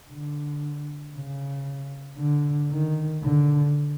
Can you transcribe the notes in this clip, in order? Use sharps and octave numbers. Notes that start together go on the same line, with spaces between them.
D3
C#3
D3
D#3
D3